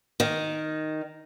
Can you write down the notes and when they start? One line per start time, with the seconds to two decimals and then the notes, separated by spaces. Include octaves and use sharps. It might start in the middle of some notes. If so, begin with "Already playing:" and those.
0.20 D#3